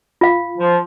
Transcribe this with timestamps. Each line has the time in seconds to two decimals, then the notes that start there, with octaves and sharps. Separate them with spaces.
0.21 F4 F5
0.58 F3